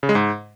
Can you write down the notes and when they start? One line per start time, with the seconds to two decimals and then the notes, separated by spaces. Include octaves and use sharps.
0.03 C#3
0.09 G#3
0.15 G#2